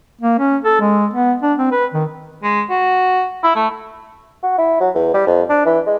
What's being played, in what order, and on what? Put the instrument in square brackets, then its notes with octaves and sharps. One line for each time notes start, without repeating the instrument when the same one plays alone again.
[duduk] A#3
C#4
A4
G#3
B3
D4
C4
B4
D#3
[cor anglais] G#3
F#4
E4
A3
[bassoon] F#4
E4
F#3
E2
G3
F2
D4
E3
G#3